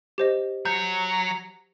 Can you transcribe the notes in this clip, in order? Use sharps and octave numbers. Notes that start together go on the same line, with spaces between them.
G4 C5 D#5
F#3 G6